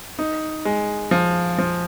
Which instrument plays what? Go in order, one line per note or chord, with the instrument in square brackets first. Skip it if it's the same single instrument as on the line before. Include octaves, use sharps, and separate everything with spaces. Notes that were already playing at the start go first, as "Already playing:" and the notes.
[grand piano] D#4
G#3
F3
F3